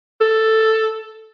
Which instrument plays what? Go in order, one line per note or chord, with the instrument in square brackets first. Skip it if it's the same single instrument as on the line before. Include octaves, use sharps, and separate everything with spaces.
[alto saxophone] A4